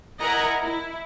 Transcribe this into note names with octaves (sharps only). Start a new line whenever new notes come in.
E4 A#4 D#5 F#5 G#5 A#5
E4